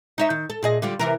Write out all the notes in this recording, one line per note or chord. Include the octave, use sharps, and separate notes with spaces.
D#4 C#5 E5
D#3
A4
A#2 G#4 D#5
D3 G3 F4
C3 E3 A#4